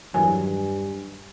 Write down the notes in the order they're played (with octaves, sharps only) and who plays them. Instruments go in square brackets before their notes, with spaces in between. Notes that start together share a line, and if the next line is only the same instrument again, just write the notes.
[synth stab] E2 D#3 F#3 [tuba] G2 [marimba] G#5